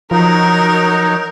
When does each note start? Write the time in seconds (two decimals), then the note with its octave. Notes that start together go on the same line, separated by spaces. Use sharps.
0.11 F3 F#3 D#4 A#4